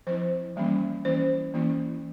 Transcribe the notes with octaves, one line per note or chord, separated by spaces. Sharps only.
F3 C4 E4 C5
E3 G3 A#3 C#4
E3 A#3 C#4 E4 C5
E3 A#3 C#4 E4